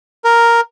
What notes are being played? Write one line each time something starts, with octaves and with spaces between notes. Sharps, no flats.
A#4